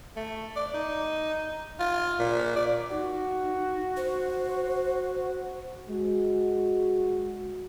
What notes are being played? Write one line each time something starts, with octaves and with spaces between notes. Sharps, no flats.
A3
D5
D#4
F4
A#2
D5
D#4 F#4
C5
G#3 F#4